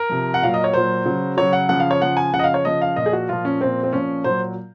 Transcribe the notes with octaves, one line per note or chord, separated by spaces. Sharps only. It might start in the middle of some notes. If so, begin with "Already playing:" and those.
Already playing: A#4
C3 F3
F#5
A#2 F#3 F5
D#5
C#5
A#2 F#3 C5
C#3 F#3
C#3 F#3 C#5
F#5
C#3 F3 F#5
F5
C#5
C#3 F3 F#5
G#5
C#3 F3 F#5
D#5
F5
C#5
C#3 F3 D#5
F5
A#2 F3 D#5
G#4
F#4
A#2 F3 F4
C#4
A#2 F3 C4
C4
A#2 F3 C#4
A#2 F#3 C5